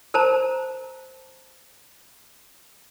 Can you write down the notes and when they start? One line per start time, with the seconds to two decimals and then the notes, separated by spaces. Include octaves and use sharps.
0.14 A#4 C5 A5 A#5